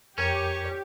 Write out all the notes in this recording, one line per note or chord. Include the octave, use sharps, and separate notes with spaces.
F2 C#4 G4 A#4 C#5 G#6